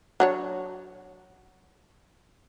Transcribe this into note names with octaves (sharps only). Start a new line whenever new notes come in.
F#3 D4 C#5